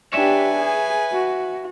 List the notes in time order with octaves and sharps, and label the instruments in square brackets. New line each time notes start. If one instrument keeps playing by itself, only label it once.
[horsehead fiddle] D4 G4 [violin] B4 G#5 [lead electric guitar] C#5 E5
[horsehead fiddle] G#4
F#4